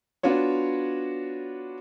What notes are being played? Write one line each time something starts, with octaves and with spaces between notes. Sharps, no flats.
B3 D4 F4 F#4 C#5